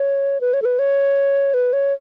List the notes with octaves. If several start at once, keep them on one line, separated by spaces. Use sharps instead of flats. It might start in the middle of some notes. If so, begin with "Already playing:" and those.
Already playing: C#5
B4
C#5
A4
B4
C#5
B4
C#5